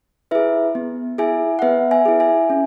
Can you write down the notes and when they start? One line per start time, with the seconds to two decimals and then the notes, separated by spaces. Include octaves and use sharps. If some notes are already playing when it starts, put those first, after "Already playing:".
0.31 E4 G#4 B4 E5
0.75 B3
1.18 E4 G#4 E5 G#5
1.59 F#5
1.62 B3 B4 E5
1.91 E5 G#5
2.06 E4 G#4
2.20 E5 G#5
2.50 C#4